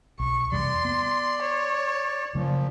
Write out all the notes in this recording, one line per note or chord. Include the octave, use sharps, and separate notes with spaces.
B1 C#6
E2 C3 G3 D5 C6
B3
C#5
A#2 C#3 F3 F#3 A3